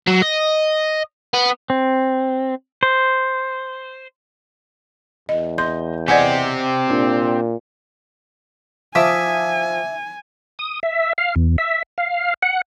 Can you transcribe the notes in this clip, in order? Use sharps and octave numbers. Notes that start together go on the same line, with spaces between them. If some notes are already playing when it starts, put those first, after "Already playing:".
F#3
D#5
B3
C4
C5
E2 D#5
D#5 C6 G6
C4 G4 D5 D#5 F#5 G#5 G#6 C#7
A#2 D4
F3 E5 G#5 D6 D#6
D#6
E5
F5
E2
E5
F5
F#5